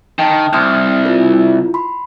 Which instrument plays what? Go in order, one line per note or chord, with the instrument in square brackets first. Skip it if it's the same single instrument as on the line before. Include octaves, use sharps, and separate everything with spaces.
[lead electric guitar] D#3 [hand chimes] G5 A5
[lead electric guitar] C2 [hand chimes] C6 D#6 F6
[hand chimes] E4 F4 A#4
B5 C6